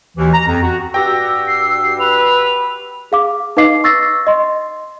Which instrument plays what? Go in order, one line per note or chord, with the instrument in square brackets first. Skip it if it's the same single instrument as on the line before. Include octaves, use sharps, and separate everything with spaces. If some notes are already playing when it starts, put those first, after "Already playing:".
[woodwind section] D#2 B2 E3
A#5
F2 A#5
F#4
[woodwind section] G2 E6 [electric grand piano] F#4 G4 G5 [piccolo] A#6
[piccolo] C7
[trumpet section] B4 [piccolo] F7
[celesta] G#4 F5 D6
D#4 B4 D#5 F5 D6 C7
C#6 E6 A6 A#6 C7
D#5 C6